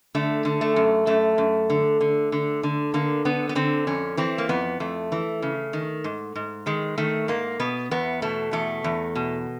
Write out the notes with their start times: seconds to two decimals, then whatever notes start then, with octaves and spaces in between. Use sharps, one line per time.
0.15 D3 A3
0.45 D3
0.61 A3
0.76 F#2
1.07 F#2 A3
1.38 F#2
1.70 D3
2.01 D3
2.32 D3
2.63 D3
2.94 D3 A#3
3.25 D3 B3
3.49 B3
3.55 D3 C4
3.87 F2 C#4
4.17 E3 C4
4.38 A#3
4.49 F2 B3
4.80 F2 A3
5.12 E3
5.42 C#3
5.73 D#3
6.04 G#2
6.35 G#2
6.66 D#3 G#3
6.98 D#3 A3
7.28 G#2 A#3
7.60 B2 B3
7.91 E2 B3
8.22 B2 A3
8.53 E2 A3
8.84 E2
9.15 B2